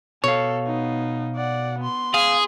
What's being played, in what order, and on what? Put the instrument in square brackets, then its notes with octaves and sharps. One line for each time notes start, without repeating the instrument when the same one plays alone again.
[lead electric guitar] B2 F5 [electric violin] A4 [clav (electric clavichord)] C#5
[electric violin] B3 D#4
D5 F#5
B3 C6
[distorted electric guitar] G#4 [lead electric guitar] F5